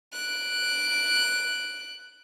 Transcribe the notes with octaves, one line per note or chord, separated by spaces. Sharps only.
F#6 D7